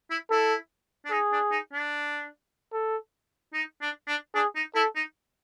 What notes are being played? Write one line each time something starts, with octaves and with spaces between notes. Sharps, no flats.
E4
E4 A4
D4
D#4 G#4
D4
D#4
D4
A4
D#4
D4
D4
D4 G#4
D#4
E4 A4
D#4